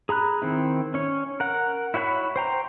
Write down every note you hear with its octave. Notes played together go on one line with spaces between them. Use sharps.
G#4 A#5 B5 F#6
D#3 C4 E4
C#4 C#5
A#4 F#5
E4 F#4 C#5 G5 B5
C5 G5 A#5